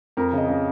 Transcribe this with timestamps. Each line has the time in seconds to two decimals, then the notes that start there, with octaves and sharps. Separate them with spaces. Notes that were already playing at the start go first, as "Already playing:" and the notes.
0.17 F2 A#4
0.33 C#3 D#5
0.49 C#3